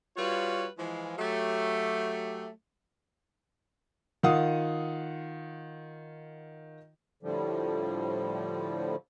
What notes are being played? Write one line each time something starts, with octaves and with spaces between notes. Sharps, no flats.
G3 F4 F#4 B4 C#5
E3 F3 G#3
F#3 A3 G4
D#3 F4 F5 F#5 D#6
A2 D3 F3 G3